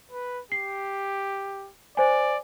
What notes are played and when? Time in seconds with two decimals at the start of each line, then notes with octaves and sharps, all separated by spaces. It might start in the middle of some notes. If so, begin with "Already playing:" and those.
0.11 B4
0.52 G4 C7
1.97 C5 D5 G#5